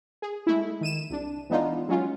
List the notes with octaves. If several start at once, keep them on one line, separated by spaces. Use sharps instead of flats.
G#4
G#3 A3 E4
D#3 D#7 E7
C2 D4
E3 G#3 B3 D4 D#4 F4
F#3 G#3 C#4 F4